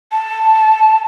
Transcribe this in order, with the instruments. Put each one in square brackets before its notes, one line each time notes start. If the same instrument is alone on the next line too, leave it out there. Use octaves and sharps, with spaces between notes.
[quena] A5